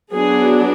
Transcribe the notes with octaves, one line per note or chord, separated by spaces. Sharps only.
F#3 B3 D4 G#4